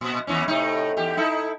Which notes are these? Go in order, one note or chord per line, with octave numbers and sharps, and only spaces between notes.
A#2
D#2 E3 C#4
A2 C3 D#4
E2 G4
D#4 E4 A4